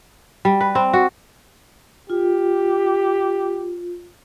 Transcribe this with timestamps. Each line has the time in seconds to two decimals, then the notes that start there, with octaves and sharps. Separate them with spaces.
0.45 G3
0.61 B4
0.75 C4
0.93 F#4
2.10 F4 G4